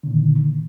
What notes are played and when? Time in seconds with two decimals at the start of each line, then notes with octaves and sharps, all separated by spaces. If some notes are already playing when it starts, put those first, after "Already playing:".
0.03 D3
0.07 A#2
0.11 D#3